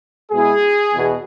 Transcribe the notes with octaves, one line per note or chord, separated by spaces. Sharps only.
B2 G#3 B3 E4 G#4
E2 B2